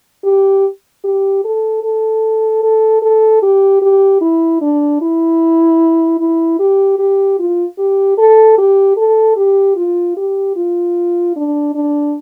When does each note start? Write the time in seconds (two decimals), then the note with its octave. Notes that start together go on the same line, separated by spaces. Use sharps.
0.25 G4
1.04 G4
1.44 A4
1.83 A4
2.63 A4
3.02 A4
3.43 G4
3.82 G4
4.21 E4
4.61 D4
5.01 E4
6.20 E4
6.59 G4
6.99 G4
7.39 F4
7.79 G4
8.18 A4
8.58 G4
8.97 A4
9.36 G4
9.76 F4
10.17 G4
10.56 F4
11.36 D4
11.75 D4